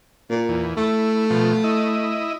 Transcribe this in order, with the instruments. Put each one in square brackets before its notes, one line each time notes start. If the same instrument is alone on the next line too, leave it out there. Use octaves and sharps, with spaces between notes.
[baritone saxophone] A#2
[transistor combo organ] E2
[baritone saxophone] A3 [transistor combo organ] E4
[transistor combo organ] B2 F3
E4 D#5